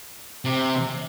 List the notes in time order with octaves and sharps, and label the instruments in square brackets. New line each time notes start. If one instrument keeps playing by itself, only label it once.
[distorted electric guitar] C3